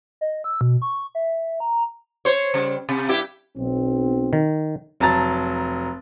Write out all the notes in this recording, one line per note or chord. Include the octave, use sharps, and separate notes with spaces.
D#5
E6
B2
C#6
E5
A#5
C5 C#5
C#3 G3
C3
G2 E4 G4
B1 C4
D#3
F1 F#3 A5 A#5 A6